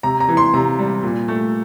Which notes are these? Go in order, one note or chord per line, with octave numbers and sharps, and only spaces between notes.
C3 A#5
A#5
E3
C6
C3 A#5
G3
A#2
A3